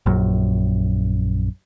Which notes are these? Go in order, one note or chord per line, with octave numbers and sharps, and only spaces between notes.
A#1 F#2